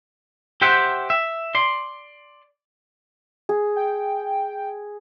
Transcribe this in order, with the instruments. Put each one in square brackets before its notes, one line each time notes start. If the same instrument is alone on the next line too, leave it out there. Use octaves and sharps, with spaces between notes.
[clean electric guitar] G4 C5 E5 F#5 G5
E5
D5 C6
[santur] G#4
[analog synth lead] G5